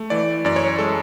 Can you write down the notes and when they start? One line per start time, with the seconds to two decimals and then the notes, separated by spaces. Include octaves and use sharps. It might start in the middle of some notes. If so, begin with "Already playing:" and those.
Already playing: A3
0.10 E3 D5
0.45 F#2 D5
0.56 C#5
0.78 G#3 A4